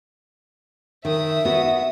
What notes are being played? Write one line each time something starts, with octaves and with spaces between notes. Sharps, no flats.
D#3 E5 D#6
B3 F#4